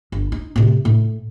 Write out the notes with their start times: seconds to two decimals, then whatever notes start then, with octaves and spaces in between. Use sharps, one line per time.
0.12 G1
0.32 D#4
0.56 A2 C3
0.85 A2